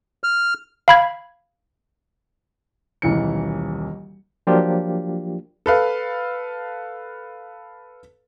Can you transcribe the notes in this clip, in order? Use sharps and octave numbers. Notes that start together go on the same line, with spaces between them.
F6
F5 B5 G#6
D#1 B1 E3 C#7
F3 F#3 A#3 D4 F4 G4
A4 B4 F5